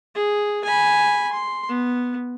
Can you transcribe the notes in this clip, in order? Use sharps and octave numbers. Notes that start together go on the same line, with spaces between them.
G#4
G#5 B5
C6
B3